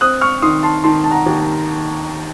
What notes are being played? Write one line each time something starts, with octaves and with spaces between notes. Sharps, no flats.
C4 D#6 F#6
C#6 F6
D#3 C6 D#6
A5 C6
D#3 A5 C6
A5
F#5 A#5
D#2